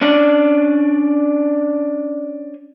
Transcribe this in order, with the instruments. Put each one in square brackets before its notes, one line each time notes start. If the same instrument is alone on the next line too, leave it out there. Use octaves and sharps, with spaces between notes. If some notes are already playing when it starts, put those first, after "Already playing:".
[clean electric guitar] C#4 D4 D5